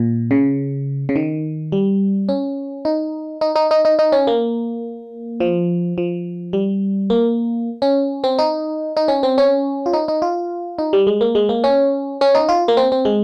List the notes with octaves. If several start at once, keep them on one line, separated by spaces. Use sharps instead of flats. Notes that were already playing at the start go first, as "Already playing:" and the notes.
Already playing: A#2
C#3
C#3
D#3
G3
C#4
D#4
D#4
D#4
D#4
D#4
D#4
C#4
A#3
F3
F3
G3
A#3
C#4
C4
D#4
D#4
C#4
C4
C#4
F4
D#4
D#4
F4
D#4
G3
G#3
A#3
G#3
A#3
C#4
C#4
D#4
F4
A#3
C4
C4
G#3